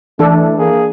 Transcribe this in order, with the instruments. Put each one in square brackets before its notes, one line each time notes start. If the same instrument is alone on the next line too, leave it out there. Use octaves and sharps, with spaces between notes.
[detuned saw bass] E3 [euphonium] A3 [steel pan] D4 A4
[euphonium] A#3 [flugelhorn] G#4